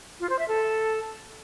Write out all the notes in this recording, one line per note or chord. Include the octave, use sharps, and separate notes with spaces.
F4
C5
E5
A4